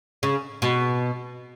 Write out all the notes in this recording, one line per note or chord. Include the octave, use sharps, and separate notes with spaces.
C#3
B2